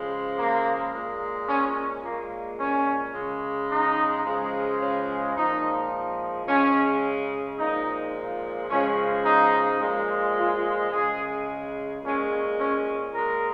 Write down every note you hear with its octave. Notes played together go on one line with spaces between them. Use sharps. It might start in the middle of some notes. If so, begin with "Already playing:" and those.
Already playing: C#3 F3 G#3
A#3
A#2 G#3
C#4
A#2 G#3 A#3
C#4
C#3 G#3
D#4
C#3 F3 G#3
C#4
A#2 F3 G#3 D#4
C#3 G#3 C#4
A#2 F3 G#3 D#4
C#3 F3 G#3 C#4
D#4
A#2 F3 G#3
F4
C#3 G#3 G#4
A#2 G#3 C#4
C#4
A#2 G#3 A#4